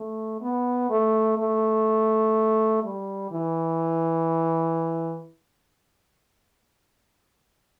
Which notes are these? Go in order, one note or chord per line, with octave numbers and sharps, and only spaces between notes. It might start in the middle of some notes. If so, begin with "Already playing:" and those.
Already playing: A3
B3
A3
A3
G3
E3